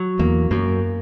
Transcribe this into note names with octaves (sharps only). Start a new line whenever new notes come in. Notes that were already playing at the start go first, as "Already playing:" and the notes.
Already playing: F#3
E2 A#3
F#2 A#3